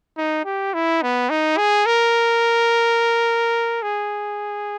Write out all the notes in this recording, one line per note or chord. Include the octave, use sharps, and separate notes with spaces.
D#4
G4
E4
B3
D#4
G#4
A#4
G#4